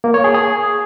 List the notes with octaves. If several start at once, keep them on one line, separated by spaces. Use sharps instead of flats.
A#3
C#5
G#4
G#4